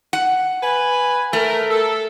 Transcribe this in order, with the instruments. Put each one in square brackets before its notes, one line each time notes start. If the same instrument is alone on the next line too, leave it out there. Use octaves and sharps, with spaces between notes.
[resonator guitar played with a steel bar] F#5
[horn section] B4 G#5
[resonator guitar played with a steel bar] A3 [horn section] A#4
[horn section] A4